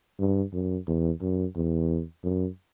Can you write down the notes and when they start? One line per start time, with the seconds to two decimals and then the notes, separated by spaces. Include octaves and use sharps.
0.19 G2
0.53 F#2
0.87 E2
1.22 F#2
1.56 E2
2.24 F#2